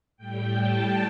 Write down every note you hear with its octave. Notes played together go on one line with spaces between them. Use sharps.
A2 G3 G5
A5